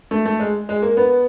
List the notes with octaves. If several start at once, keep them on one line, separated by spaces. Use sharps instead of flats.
A3
A3
G#3
G#3
A#3
B3